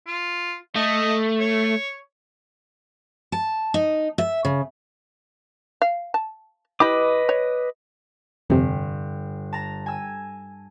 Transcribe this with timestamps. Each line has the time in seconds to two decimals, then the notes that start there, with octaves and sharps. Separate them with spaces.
0.07 F4
0.75 A3 D#5
1.40 C#5
3.32 A5
3.74 D#4
4.18 E5
4.45 C#3
5.82 F5
6.14 A5
6.80 E4 G4 B4 D#5 B5 D6
7.29 C#5
8.50 G1 F2 C3
9.53 A5 A#5
9.86 G#5 E6